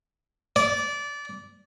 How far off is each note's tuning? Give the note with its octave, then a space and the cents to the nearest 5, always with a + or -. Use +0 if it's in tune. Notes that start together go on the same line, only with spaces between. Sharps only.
D5 -20